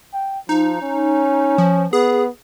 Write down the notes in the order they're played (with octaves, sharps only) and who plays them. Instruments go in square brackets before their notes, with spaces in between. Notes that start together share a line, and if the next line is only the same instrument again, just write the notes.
[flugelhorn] G5
[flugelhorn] F3 [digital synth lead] D#4
[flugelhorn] C#4
[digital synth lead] F3
[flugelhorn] B3 [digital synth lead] G#4